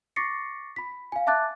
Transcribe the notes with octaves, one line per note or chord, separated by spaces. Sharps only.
C#6 D6 A6 A#6 C7 C#7
B5 B6
F5 G#5
E5 A5 D6 F#6 A6